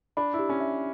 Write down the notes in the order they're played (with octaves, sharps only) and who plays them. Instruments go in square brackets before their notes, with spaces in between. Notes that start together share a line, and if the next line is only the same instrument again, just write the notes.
[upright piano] D4 [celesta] B5
[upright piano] E4
[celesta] G4
[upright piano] C#4
[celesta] E5